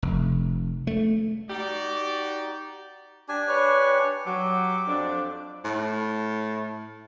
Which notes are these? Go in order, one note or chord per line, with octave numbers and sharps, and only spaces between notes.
F1
A3
D#4 F#4 G4 D5
D4 G4 G#5
B4 C#5
F#3 G4 D6
F2 D4
A2